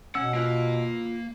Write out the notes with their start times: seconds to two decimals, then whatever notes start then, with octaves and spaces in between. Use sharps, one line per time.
0.15 B2 C#4 F#5 E6
0.34 A#3 F4 B4